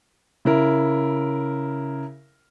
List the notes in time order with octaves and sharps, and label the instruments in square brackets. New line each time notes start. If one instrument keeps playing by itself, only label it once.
[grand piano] C#3 E4 A#4